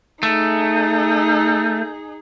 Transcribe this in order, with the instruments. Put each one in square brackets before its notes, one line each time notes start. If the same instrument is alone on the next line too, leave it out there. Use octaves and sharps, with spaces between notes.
[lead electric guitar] A3 [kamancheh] D#4 G#4